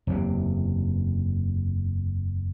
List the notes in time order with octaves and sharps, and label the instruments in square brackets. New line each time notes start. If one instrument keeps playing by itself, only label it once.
[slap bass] F#1 E2 G2 C3